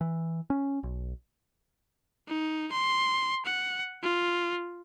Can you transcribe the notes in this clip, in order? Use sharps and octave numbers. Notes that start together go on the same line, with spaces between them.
E3
C#4
B1
D#4
C6
F#5
F4